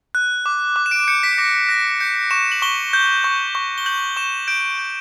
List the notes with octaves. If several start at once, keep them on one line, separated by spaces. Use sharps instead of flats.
F#6
D6
D6
E7
D7
G6 C#7
B6
D6 A#6
F#6 A#6
G6 C#7
C#6 E7
F#7
C#6 G7
G6
C#6
C#6
G7
G6 F#7
C#6 E7
G6 D7
G6